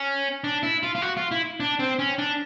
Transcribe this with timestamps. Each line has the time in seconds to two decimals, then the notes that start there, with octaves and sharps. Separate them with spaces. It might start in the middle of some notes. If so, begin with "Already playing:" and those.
Already playing: C#4
0.44 D4
0.63 E4
0.83 F4
0.95 F4
1.02 F#4
1.17 F4
1.31 E4
1.60 D4
1.79 C4
1.99 C#4
2.18 D4